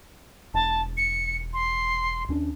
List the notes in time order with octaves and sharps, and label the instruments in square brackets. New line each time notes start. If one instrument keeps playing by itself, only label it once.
[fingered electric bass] E1 [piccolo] A5
[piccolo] C#7
C6
[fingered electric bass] D#2 C#4 D4